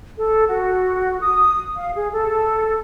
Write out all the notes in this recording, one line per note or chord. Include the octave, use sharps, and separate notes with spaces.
A4
F#4
D#6
F5
G#4
A4